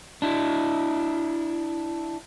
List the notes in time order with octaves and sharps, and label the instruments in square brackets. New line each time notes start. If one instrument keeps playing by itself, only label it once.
[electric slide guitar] D4 E4